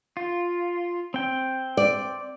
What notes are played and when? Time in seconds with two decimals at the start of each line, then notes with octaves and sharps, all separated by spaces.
0.17 F4
1.14 C4 G5
1.77 D5